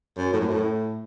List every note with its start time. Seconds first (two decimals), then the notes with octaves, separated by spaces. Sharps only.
0.18 F#2
0.33 A2
0.41 F#2
0.49 A2